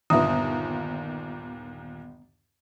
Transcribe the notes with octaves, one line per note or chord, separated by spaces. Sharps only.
G1 D#2 A#2 B3 E5 A#5 D#6